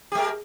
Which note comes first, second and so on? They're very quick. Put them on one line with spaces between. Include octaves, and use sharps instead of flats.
G4 G#3 A#4